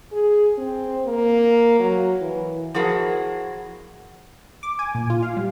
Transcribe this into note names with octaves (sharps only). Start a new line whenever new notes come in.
G#4
C4
A#3
F#3
E3
F3 E4 F#4 G#4 A#4
D6
G#5
A#2
F4
F5
G3